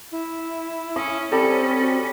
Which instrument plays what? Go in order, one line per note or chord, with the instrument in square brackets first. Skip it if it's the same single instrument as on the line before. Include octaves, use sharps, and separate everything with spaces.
[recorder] E4
[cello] C#4 [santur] D#6
[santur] G3 A4 [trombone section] C4 [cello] C#4
[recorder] F#4